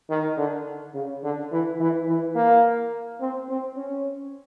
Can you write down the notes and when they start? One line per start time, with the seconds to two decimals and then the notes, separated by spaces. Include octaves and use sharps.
0.10 D#3
0.37 D3
0.94 C#3
1.23 D3
1.52 E3
1.80 E3
2.08 E3
2.35 A#3
3.20 C4
3.49 C4
3.77 C#4